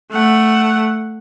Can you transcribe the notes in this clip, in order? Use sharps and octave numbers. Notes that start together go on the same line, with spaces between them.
A3 F#5